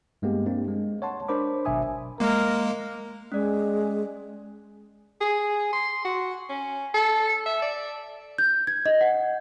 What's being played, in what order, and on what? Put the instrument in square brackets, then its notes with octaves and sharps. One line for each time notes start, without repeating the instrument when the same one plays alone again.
[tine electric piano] G2 G#3 A#3 B3 G4
A#3 C4 D4
G#3
C#5 F#5 A5 C6
D4 A#4 C5 B5 D6
G#1 B2 F#3 E5 G#5 D#6
[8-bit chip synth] G#3 A#3 [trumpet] A#4
[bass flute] G#3 [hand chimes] C#4 D5
[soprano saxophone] G#4
C6
F#4
C#4
A4
E5
D5
[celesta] G6
G#6
D#5
F#5